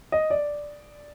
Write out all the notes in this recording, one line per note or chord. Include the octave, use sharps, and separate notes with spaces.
D#5
D5